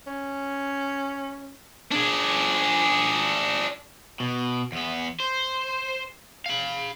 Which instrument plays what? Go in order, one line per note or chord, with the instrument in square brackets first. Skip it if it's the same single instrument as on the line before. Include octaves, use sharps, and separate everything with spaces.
[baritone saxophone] C#4
[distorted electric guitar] D4 G#4
[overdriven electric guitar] B2
E2 B3
C5
F5 B5